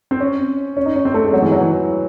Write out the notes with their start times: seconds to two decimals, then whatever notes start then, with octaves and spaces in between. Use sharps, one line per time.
0.11 C4
0.20 C#4
0.77 C#4
0.86 D#4
0.96 C#4
1.05 C4
1.14 A3
1.24 G#3
1.33 F#3
1.42 E3
1.52 F#3
1.61 E3